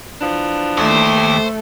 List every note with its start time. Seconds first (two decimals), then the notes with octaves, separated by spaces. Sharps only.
0.20 E3 F3 D4
0.78 D#2 A3 C5